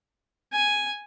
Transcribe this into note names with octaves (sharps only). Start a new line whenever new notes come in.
G#5